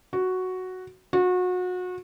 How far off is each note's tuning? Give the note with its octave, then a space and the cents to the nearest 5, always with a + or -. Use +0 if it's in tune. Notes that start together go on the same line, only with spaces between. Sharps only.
F#4 +0
F#4 -30